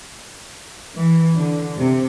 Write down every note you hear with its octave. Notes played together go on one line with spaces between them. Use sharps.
E3
D3
C3